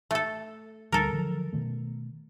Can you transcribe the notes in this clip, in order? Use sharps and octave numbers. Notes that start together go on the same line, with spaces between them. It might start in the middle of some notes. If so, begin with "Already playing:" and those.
A3 A4
D2 G3 A4 A#4
D3 F3 F#3
B2 D#3 A3